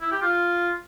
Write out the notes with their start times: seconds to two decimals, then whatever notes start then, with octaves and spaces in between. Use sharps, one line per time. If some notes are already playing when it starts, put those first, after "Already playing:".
0.01 E4
0.11 G4
0.22 F4